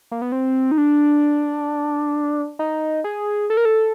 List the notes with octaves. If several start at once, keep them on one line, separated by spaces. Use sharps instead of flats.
A#3
B3
C4
D#4
D4
D#4
G#4
A4
A#4
A4